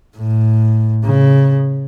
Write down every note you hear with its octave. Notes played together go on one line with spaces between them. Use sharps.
A2
C#3